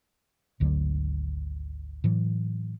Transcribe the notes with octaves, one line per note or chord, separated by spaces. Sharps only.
G#1 D2 D3 F#3
A2 E3 F#3